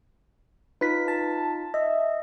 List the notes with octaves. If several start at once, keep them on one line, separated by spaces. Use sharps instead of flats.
D#4 F4 B4 B6
A5
D#5 E5